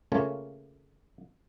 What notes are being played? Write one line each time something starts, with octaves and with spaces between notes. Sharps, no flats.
C#3 A3 A#3 C#4 F4 C#5